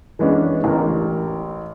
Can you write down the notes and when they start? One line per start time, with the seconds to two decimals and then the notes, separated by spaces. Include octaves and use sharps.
0.19 E3 G#3 B3 C#4 D4
0.64 A1 A#4